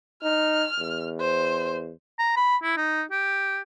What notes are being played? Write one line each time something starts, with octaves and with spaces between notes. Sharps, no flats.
D#4 F6
E2
C5
A#5
B5
E4
D#4
G4